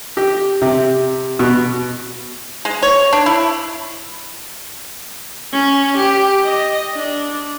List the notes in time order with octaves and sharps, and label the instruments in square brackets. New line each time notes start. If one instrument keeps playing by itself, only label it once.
[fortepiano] G4
C3
B2
[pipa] G#3
C#5
D4
E4
[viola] C#4
G4
D#5
D4